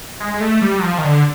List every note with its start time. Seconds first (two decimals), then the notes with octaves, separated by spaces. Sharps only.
0.20 G#3
0.34 G#3
0.41 A3
0.62 G3
0.79 F#3
0.83 F3
0.98 D#3
1.04 D3